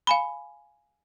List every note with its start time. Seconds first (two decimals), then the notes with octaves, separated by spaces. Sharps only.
0.07 F5 G#5 B5